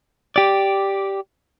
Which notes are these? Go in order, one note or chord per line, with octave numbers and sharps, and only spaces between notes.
G4 D5